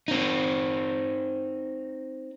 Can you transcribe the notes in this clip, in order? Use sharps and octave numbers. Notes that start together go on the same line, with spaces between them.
C4 D#4